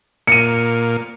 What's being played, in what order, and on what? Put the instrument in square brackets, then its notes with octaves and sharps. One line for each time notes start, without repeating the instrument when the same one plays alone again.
[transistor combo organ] A#2 [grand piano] C#7 D#7